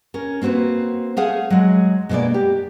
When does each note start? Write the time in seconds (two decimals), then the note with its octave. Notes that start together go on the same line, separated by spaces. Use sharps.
0.14 C#4 A#4
0.42 A#3 C4 F#4 B4 C5
1.17 A3 G#4 F5 F#5 G#5
1.50 F#3 G#3
2.09 B2 D3 G#3 A#3 D5
2.34 G4